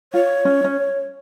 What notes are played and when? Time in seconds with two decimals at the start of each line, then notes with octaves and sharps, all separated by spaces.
0.13 F4 C#5
0.45 C#4
0.64 C#4